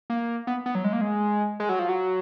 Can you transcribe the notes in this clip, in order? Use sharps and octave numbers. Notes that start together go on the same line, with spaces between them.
A#3
B3
B3
F#3
G#3
A#3
G#3
G#3
F#3
F3
F#3